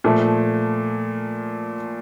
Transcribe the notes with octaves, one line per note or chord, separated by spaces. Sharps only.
A#2 F3 A3